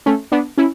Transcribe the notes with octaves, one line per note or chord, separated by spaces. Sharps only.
A3 C#4
B3 D4
C#4 E4